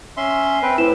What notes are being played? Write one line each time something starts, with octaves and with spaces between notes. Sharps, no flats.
C#4 E5 C6
C4 B4
A2 E4 B4 E7